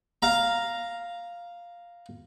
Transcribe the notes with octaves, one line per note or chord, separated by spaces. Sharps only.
F5 A#5